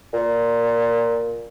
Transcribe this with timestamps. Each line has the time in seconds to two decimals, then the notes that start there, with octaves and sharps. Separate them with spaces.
0.13 A#2